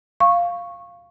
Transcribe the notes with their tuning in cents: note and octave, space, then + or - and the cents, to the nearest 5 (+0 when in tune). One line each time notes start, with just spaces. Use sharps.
F5 +0 C#6 -15